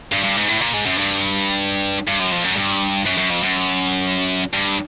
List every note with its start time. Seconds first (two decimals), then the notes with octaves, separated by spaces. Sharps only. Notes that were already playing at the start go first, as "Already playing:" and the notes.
0.12 G2
0.24 G2
0.36 G#2
0.48 A2
0.61 A#2
0.73 G#2
0.86 F#2
0.97 G2
2.08 G2
2.20 F#2
2.32 F2
2.45 F#2
2.57 G2
3.06 F#2
3.18 F#2
3.31 F2
3.43 F#2
4.53 G2